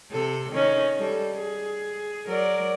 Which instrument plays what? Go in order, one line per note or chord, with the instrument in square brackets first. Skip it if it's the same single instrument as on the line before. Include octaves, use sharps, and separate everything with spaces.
[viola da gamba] C3 A4
D#3 C#4 D#4
G3 A4
G#4
F#3 A#4 D5